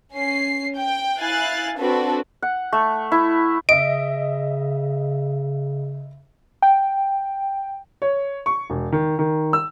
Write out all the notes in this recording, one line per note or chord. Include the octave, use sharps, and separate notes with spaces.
C#4 C7
G5
E4 F5 G#5 F#6 A6
C4 D4 F#4 A4 B4
F#5
A3
E4
C#3 D#5 E5 D7
G5
C#5
C#6
E1
D#3
D#3
E6